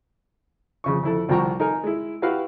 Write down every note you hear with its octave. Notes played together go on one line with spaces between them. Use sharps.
F2 C#3 C#6
F2 E4 A4
C2 F3 F#4 G5 A#5 C#6
D#4 A#4 G#5
G#3 E4
E4 F#4 G4 B4 F5